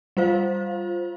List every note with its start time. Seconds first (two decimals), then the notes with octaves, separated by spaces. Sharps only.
0.17 G3 F4 C5 F5